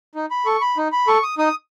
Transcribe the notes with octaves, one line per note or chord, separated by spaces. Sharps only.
D#4
B5
A4 C#6
B5
D#4
B5
A4 C#6
D#6
D#4 D#6